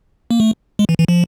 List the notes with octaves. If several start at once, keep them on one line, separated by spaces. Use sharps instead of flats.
A#3
A3
G#3
E3
E3
F3